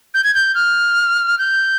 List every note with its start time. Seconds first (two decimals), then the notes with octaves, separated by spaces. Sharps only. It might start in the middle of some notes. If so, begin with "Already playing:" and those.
0.14 G6
0.24 G#6
0.35 G6
0.55 F6
1.38 G6